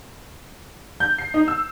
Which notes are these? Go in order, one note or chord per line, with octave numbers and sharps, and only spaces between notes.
G6
C7
D#4
E6